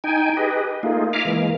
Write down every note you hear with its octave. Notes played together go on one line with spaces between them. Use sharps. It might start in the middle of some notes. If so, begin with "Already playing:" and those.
D#4 G5 G#5
G4 G#4 B4 D#5
A3 A#3 D#4 F4 G#4
E5 F5 G#5 A#5 D6 F6
E3 G#3 A#3